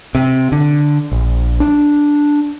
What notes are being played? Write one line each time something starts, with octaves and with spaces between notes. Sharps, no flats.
C3
D3
A#1
D4